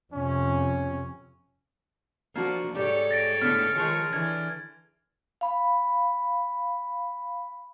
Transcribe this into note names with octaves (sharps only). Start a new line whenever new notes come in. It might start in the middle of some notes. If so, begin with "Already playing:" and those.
F2 C3 C#4
F3 A#3 D4 F#4
G#2 G3 G4 A4 C#5 D5
A6 A#6 D7
A2 D3 B3 F6
D#3 F3 G#3 G#4 C#5
D3 E3 G#6
F5 B5